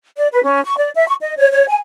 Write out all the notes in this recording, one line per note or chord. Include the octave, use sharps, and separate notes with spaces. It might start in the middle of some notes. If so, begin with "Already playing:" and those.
D5
B4
C#4
C#6
D5
E5
C#6
D#5
C#5
C#5
G#5